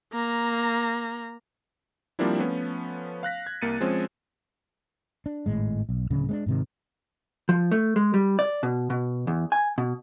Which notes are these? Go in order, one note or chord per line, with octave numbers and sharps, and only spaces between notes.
A#3 A#5
F3 G3 A#3 C4 D4 E4
F3 A3 B3 C#4
F5 F#6 A#6 B6
G#6
C2 A#3 A6 C#7 D#7
F3 G#3 C4 C#4
D4
G#1 A2 G#3
B1
D1 C#3
G#3 C4 D4
G#2 C3 D#3
F3
A3
G#3
G3
D5
B2
B2
E2
G#5
B2